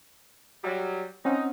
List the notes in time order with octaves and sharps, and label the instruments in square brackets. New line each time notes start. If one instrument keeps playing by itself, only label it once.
[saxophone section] F#3 G3
[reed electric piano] C4 C#4 F#5 [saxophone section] D#4